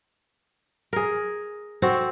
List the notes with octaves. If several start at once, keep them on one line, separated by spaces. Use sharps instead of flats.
G#4 A#4
C4 F#4 A4 C5